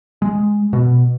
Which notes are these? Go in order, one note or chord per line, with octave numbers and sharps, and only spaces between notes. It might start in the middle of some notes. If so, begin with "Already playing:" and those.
G#3
B2